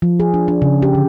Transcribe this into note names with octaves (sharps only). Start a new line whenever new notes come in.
F3
G#4
D4
D4
C#3
G4
D3